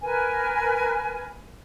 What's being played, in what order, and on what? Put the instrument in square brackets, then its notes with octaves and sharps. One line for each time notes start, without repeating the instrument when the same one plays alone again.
[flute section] A#4 B4 G#5